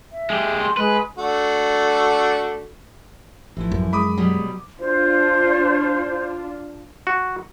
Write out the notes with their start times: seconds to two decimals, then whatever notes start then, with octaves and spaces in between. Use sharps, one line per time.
0.12 E5
0.30 G#3 G4
0.60 C6
0.77 G#3 B4
1.18 A3 D4 F#4
3.57 A1 E3 F3 E4
3.72 F#2
3.93 G#3 B5 D6 D#6
4.18 B2 F#3 G3
4.80 D4 F4 C5
7.07 F#4